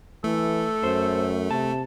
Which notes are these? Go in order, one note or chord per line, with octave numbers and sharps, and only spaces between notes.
E3 A3 A4
F#2 C5
C3 A5